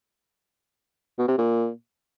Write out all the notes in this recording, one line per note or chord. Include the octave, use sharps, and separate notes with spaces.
B2
C3
A#2